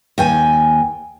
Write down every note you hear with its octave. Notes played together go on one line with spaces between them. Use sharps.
D#2 G5 G#5